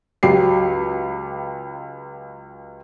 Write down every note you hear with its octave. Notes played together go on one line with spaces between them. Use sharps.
C#2 F#3 G4 C7